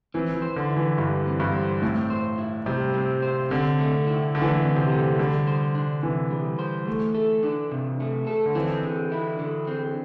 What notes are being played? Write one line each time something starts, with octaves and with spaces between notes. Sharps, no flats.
E3 C4
E3
C5
D3
E4
E3
G2 E3
C4
G2
C5
A2 C4
C5
E4
C3 G3
C4
C5
D3 C4
A3
E4
D3 A3
E3
D3
C4
C3
A3
D3 G3
C5
D4
C3 E3
G3
C5
A3
A4
D4
C3
A3
A4
D3
E3 C4
D3
E4
D3
C4